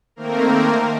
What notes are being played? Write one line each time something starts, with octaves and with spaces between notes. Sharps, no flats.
D#3 A3 A#3 C4 A#4